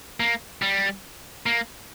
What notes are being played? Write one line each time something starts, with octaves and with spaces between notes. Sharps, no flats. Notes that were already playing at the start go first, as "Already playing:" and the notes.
A#3
G3
A#3